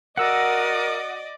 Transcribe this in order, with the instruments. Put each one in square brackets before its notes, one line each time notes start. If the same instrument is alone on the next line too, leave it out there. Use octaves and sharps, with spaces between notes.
[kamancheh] F#4 D#6 [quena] A#4 [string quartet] D5 D#5 [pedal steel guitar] F#5 E6